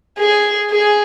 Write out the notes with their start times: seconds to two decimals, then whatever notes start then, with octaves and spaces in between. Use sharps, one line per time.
0.18 G#4
0.70 G#4